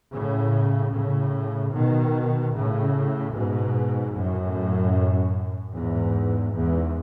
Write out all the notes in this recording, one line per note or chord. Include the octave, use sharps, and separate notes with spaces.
A2 C#3
A2 C#3
B2 D#3
A2 C#3
G#2 B2
F#2 A2
E2 G#2
E2 G#2